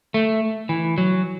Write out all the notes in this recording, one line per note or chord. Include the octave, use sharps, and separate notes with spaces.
A3
E3
F#3